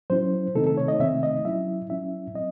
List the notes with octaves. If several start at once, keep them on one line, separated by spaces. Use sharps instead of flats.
F#3 C#4 E4 C5
C3 D#3 A3 C4 D#4 A4
A4
C#5
D#5
C3 D#3 A3 C4 D#4 E5
D#5
F#3 C#4 E4 E5
F#3 C#4 E4 E5
F#3 C4 D#5